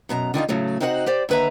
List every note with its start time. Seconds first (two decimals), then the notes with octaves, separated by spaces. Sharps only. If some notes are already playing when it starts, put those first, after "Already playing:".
0.09 F#2 B2 A5 A#5
0.34 D3 D#3 D#4 F4
0.49 A2 C#3 F#3 A3
0.80 C3 C4 D#4 F#4 D5 F#5
1.06 G4 C5 D5
1.29 D#2 D3 B4 E5 A#5